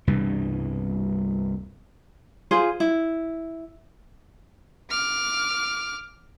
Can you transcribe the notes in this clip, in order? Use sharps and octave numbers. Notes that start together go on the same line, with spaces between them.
C2 G2 B2 E3
F4 G#4 C5
E4
D6 F6